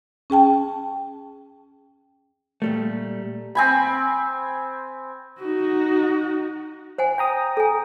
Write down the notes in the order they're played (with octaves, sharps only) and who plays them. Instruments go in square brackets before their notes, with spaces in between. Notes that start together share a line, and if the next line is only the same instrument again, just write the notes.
[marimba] C#4 G#4 G5 A5
[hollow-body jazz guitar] A#2 G3 A3
[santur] C4 G#5 B5
[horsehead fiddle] D#4 F#4
[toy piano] C5 F#5 G#5
[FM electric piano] G5 A#5 D#6
[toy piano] A4 G#5